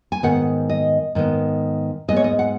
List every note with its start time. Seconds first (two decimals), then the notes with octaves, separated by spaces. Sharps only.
0.12 G#5
0.23 G#2 D#3 B3 F#5
0.69 D#5
1.15 G#2 D#3 B3
2.08 G#2 G#3 B3 D#5
2.16 C#5
2.24 D#5
2.39 F#5